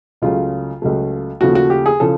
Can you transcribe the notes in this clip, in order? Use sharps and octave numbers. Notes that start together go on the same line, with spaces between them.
C#2 C#3 F#3 A3 F4
C#2 C#3 F#3 A3
D#2 C#3 F3 A3 F#4
F#4
G4
G#4
C#3 F3 A4